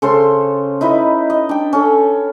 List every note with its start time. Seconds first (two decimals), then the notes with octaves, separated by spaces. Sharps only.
0.02 C#3 A4 C5 C6
0.81 D#4 E4 B4 D#5
1.30 D#5
1.49 D4 G5
1.73 C#4 A4